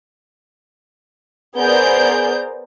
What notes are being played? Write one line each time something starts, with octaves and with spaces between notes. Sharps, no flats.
B3 G#4 A#4 C5 D5 G6